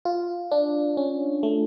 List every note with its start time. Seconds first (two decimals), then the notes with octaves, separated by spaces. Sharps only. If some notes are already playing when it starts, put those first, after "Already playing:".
0.05 F4
0.51 D4
0.97 C#4
1.43 A3